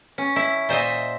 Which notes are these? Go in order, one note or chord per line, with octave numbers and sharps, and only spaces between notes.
C#4
E4
A#2 C5 D#5 E5